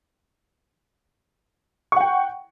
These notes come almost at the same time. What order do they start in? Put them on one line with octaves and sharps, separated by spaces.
C#6 F#5 G5